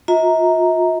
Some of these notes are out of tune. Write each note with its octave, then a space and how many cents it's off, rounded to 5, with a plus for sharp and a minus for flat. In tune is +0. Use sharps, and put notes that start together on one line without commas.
F4 +40 E5 -45 A#5 +0